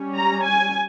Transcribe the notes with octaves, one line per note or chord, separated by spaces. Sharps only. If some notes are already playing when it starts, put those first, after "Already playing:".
Already playing: G3 C#4
A#5
G#5